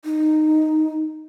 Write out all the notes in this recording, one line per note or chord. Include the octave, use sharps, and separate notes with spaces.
D#4